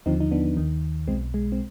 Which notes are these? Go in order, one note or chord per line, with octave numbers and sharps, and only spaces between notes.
D#2 D3 F3 C4 D#4
D#4
B3 D4
D#2 D#3
B1 B2 G#3 C4
G#3
C4